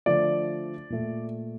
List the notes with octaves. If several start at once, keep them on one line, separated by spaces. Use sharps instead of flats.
D3 F3 A3 D5
A#2 A3